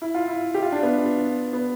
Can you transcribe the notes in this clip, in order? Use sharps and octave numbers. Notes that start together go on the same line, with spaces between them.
E4
F4
E4
G4
F4
D4
B3
B3